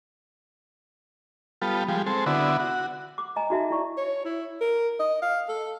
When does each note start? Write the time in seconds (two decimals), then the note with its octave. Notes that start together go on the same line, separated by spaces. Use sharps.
1.62 G3 B3 F4 A4
1.88 F3 G3 G#3
2.06 G#3 C4 A4
2.26 D3 B3 E4 F#4
2.60 F#4
3.18 D6
3.36 D#5 G#5 A#5
3.50 D#4 F#4 E5 A5
3.71 E4 D5 C#6
3.97 C#5
4.25 E4
4.61 A#4
5.00 D#5
5.22 F5
5.49 A4